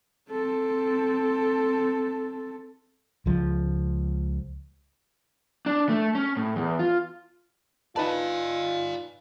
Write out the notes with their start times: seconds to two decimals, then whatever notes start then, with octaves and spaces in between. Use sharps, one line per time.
0.30 C4 A4
3.26 C#2 F3
5.66 D4
5.89 A3
6.15 C#4
6.37 A2
6.56 E2
6.79 F4
7.96 D#4 F4 B4 D5 G#5 A5